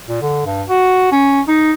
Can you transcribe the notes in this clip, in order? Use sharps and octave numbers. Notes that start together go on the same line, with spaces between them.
A#2
D3
G2
F#4
C#4
D#4